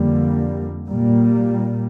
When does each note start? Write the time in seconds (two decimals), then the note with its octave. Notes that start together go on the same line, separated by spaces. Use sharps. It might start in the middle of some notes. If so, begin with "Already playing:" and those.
Already playing: F2 D3 G3 A#3
0.89 A#2 G3 A#3